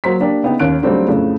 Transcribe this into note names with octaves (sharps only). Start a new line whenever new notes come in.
F#3 A#3 C5 A#5 C6 B6
A#3 D4 G4
C#3 B3 D#4 G5
D#2 C#4 F#6 D7
C#3 F#3 G3 A3 C4 D4
F2 A2 C#3 A3